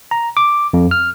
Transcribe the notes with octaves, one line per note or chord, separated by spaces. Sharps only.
A#5
D6
F2
F6